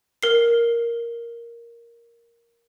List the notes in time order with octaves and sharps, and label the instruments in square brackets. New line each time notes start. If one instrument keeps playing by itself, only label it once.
[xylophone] A#4 C7